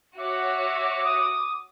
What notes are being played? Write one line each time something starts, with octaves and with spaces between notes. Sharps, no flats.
F#4 C#5 E5 D6
D#6